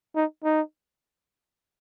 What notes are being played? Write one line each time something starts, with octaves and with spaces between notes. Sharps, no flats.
D#4
D#4